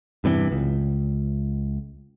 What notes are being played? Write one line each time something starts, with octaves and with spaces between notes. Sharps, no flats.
E2 G2 C3 E3
C#2